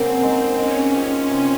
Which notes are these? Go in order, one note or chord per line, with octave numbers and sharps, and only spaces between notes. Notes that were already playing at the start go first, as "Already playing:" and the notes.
Already playing: C#3 F#3 A#3 C4
G#3 D#4
G#3 C#4
C4 F4 G#4
C3